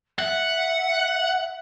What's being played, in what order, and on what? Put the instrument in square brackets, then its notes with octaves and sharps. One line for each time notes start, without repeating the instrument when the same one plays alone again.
[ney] E5 [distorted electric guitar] F#5